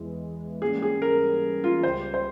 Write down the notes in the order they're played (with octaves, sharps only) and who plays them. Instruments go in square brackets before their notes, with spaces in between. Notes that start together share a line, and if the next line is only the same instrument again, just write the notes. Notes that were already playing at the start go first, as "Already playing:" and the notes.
Already playing: [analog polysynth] E2 E3 G#3
[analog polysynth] G#2 E3 G3 A#3 C#4 [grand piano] G#4
[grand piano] G#4
A#4
F4
[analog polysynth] C#2 C#3 G3 [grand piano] C5
[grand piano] C5